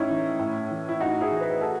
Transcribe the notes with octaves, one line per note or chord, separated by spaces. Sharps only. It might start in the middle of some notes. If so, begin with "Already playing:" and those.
Already playing: A2 C#4 D#4 E4
E3
A2
E3
E4
A2 D#4 F#4
E4 G#4
E3
G#4 B4
F#4 A4